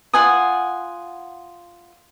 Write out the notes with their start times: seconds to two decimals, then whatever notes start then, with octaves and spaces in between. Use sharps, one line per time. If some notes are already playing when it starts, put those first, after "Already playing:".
0.14 F4 F#5 G#5 D#6